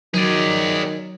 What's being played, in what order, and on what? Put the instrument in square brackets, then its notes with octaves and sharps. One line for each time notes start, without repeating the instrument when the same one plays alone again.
[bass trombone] D#3 [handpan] F#3 [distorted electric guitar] G#4 D5